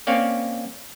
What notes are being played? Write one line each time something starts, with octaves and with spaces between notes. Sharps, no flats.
A#3 C4 C#4 C#5 D5 F5